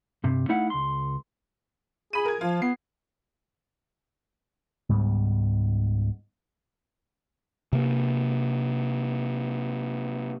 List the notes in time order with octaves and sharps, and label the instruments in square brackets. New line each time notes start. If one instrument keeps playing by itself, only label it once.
[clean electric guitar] G2 C3
A3 D#4 E4 F5 F#5
C#2 C6
[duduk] G#4 [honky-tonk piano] B5 D#7
[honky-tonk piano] A#4 G#6
[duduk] F3 [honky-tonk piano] F4
[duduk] B3 [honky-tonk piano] C7
[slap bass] C#2 G#2 G3 B3
[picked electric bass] C3 A#3